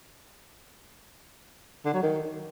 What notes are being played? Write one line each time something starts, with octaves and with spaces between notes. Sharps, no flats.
D3
F#3
D#3